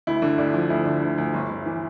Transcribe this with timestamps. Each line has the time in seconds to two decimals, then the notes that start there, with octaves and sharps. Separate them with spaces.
0.07 D2 E4
0.22 D3
0.38 D2 D4
0.54 F3
0.70 D2 E4
0.85 D3
1.02 D2
1.18 D2
1.34 G1
1.49 G1
1.66 E3